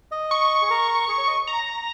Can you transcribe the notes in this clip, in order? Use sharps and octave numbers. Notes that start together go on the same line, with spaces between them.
D#5
C#6
G#4
A#4
G#4
C#5
D#5
A#5